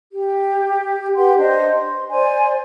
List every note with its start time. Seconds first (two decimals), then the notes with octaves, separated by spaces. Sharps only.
0.12 G4
1.16 G4 B4 F#5 C6
1.38 D4 C5 D#5
1.71 C6
2.12 C5 D5 G#5 C6